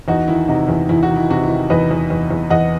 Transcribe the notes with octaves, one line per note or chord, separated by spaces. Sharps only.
E2 D#4 F#4
D#3 E4
C3 D#4 F#4
E2 E4
E2 E4
F#4
D#3
E4
C3 F#4
E4
D#3
E2 B4 D#5
E2
E2
E2
E2 D#5 F#5